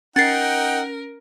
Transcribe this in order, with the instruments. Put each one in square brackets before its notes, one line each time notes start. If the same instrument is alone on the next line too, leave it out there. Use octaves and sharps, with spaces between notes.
[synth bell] C#4 [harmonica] D#4 F#5 G5 [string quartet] A#4 [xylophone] A6 C7